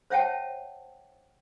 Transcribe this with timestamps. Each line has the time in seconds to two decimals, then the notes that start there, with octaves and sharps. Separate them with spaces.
0.10 C5 C#5 E5 F#5 G5 A5